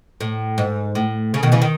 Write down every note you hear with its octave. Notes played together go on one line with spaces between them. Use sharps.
A2
G#2
A2
C#3
B2 D#3
C#3 E3
D#3